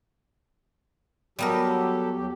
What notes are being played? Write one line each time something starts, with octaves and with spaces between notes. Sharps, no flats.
F#3 G3 B3 G4 A4 A#4
E2 F#3 G4